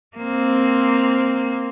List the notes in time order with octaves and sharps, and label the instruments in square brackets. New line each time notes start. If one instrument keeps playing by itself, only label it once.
[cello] A#3 C4